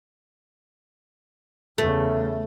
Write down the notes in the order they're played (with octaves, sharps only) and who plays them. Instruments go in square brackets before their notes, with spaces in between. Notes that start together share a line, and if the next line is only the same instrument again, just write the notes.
[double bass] E2 C#3 [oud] A3